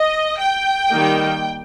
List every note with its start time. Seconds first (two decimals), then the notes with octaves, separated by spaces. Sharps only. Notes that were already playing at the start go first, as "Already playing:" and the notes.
Already playing: D#5
0.38 G5
0.90 D#3 G3 A#3 D#4